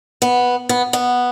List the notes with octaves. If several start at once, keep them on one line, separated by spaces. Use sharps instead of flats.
B3
B3
B3